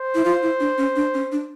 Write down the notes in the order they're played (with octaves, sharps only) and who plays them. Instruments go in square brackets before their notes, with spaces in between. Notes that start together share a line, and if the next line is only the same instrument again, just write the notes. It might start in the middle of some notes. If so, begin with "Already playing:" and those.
Already playing: [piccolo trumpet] C5
[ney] E4
F4
E4
D4
C#4
D4
C#4
D4